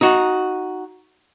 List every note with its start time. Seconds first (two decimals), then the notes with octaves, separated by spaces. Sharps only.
0.01 D#4 F#4